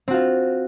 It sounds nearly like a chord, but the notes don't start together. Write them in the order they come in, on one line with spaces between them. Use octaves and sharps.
C4 F#4 F4